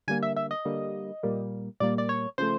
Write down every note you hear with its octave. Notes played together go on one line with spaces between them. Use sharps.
D3 G3 A#3 G#5
E5
E5
D#5
D3 G3 A#3
A#2 G3 A#3
A#2 G3 A#3 D5
D5
C#5
C#3 F3 A3 C5